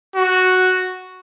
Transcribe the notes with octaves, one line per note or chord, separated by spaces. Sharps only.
F#4